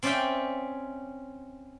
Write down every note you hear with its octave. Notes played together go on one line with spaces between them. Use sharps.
C4 C#4 D5 E5 F5 G5